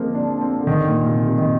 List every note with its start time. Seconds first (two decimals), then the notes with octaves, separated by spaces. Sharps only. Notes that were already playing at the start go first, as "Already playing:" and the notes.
Already playing: D3 F3 G#3 A#3 C4
0.15 D4
0.41 C4
0.60 D3
0.67 D#3
0.87 A#2
1.06 C3
1.26 C3
1.38 D#3